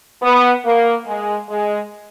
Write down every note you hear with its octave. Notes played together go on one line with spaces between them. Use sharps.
B3
A#3
G#3
G#3